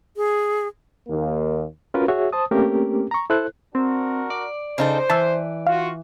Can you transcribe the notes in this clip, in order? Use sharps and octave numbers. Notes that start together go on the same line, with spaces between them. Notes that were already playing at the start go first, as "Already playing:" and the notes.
G#4
D#2 A#3
C#4 F4 F#4 A#4 B4
F#4 G#4 C#5 E5
C5 A5 D#6
A3 A#3 C4 C#4 G4 A#4
A#5 C#6
E4 A4 C5 F#6
C4 D4 F#4 A#4
D5
C#3 D#4 A4 C5
E3 A5 E6
F4 F#4 F5